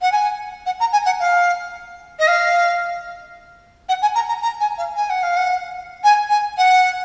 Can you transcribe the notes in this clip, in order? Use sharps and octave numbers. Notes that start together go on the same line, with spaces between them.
F#5
G#5
F#5
A#5
G#5
F#5
F5
D#5
F5
F#5
G#5
A#5
A#5
A#5
G#5
F5
G#5
F#5
F5
F#5
G#5
G#5
F#5